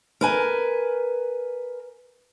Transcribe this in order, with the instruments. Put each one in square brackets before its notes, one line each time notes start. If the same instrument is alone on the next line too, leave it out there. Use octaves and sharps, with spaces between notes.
[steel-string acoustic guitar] A#4 B4 G#5